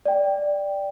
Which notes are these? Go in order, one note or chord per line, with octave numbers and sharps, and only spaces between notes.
D5 G5